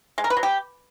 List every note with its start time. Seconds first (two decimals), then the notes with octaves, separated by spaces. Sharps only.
0.18 G#3
0.24 A#4
0.30 B4
0.37 F#3
0.43 G4